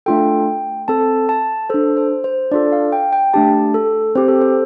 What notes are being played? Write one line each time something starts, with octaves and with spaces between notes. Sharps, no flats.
A3 D4 F4 A4 G5
C4 A4 A5
A5
D4 A4 C5
C5
C5
D4 F4 A4 D5
F5
G5
G5
A3 D4 G4 A5
A4
C4 G4 C5
A4
C5